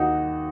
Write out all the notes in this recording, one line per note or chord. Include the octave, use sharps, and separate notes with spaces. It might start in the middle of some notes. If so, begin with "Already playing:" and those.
Already playing: D#2 D#4 F#4